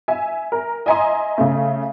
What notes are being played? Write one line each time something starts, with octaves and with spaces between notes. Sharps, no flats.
E5 G#5
A#4
D#5 E5 G#5 A#5 C6 D#6
C#3 A3